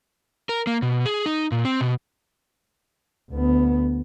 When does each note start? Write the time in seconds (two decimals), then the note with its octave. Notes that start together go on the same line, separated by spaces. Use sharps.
0.49 A#4
0.67 A#3
0.82 B2
1.06 G#4
1.26 D#4
1.52 A#2
1.65 C4
1.81 B2
3.30 D2 B3